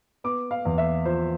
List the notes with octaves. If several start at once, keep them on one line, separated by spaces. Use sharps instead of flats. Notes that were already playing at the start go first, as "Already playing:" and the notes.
B3 D6
F5
E2
E5
F3 C5